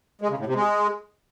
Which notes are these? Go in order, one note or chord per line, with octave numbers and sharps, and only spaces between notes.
G#3
C#3
A2
C3
G#3